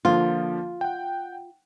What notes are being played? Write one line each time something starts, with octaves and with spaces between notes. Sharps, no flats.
D3 F3 A#3 F4
F#5 G5